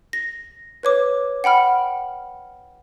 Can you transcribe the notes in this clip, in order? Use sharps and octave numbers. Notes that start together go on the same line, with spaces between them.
A#6
B4 C#5 D6
F#5 G5 B5 F6